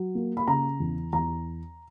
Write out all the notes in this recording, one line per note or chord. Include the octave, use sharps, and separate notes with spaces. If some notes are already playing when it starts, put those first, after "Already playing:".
Already playing: F#3
A#3
B5
C#3 A#5
E2
E2 A#5